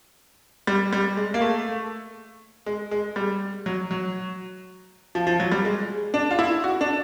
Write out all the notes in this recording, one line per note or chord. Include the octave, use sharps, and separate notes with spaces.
G3
G3
G#3
A#3
A3
G#3
G#3
G3
F#3
F#3
F3
F3
F#3
G3
G#3
D4
F4
E4
F#4
D4